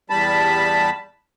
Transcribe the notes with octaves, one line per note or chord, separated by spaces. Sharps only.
E2 G3 A5 B5